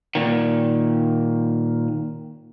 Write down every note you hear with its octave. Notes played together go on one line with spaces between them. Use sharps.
A#2 D#3